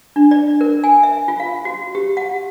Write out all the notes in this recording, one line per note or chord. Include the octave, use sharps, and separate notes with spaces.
D4
D5
A#4
G#5
E5
F4
F5
F#4
G4
F#5